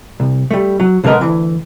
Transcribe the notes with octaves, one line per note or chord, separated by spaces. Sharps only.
C2
G3 A3
F#3
B1 D3 G#3 B3 A#4 D#5
D2 E3